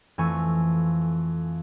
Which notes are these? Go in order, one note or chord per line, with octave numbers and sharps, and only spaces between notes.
F2 E3 A3 G#5 C#6